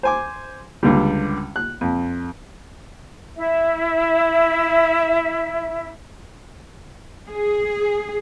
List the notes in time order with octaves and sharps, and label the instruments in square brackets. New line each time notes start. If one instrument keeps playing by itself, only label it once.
[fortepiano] C5 G#5 D6
C#2 D3 G3
F#6
F2
[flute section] E4 E5
[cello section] G#4